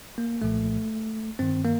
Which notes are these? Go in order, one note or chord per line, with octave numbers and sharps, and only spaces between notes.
A#3
C2 A#2 F3 A3
G2 D#3 C4
A#3